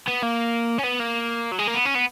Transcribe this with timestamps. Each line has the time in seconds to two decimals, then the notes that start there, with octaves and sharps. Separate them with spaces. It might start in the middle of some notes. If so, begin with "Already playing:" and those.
0.08 B3
0.23 A#3
0.78 C#4
0.83 B3
0.99 A#3
1.52 F#3
1.59 G#3
1.68 A#3
1.75 B3
1.86 C#4
1.95 B3